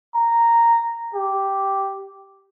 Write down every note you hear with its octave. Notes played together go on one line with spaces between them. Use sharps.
A#5
G4